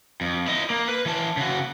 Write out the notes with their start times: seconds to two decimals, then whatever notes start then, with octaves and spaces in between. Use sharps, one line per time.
0.21 F2
0.47 E4 D#5
0.70 A#3
0.88 B4
1.06 E3 A5
1.37 C#3 F#4